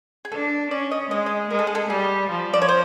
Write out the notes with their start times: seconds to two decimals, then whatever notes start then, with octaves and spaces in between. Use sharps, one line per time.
0.25 G#4
0.32 D4 A4
0.71 C#4 D5
0.91 D#5
1.10 G#3 D#5
1.26 D#5
1.50 G#3 A#4
1.59 A4
1.67 G#4
1.75 A4
1.90 G3 G#4
2.30 F3
2.54 D5
2.62 C#5
2.69 C5